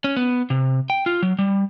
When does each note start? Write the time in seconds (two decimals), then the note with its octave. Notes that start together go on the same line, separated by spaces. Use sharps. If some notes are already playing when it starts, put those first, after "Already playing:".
0.04 C#4
0.17 B3
0.50 C3
0.90 G5
1.06 F4
1.22 F#3
1.39 G3